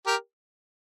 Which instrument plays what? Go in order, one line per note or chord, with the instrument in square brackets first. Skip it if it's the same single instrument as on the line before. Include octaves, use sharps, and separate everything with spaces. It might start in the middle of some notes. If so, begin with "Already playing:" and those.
[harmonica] G4 A#4